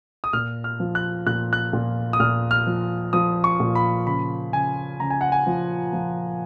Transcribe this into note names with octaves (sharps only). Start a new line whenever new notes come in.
D#6
A#2 F6
F6
F3
F#6
A#2 F#6
F#6
A#2
D#6
A#2 F6
F6
F3
F3 D#6
C#6
A#2
B5
C#3 B5
C#3 G#5
C#3 A#5
G#5
F#5
G#5
F3
F3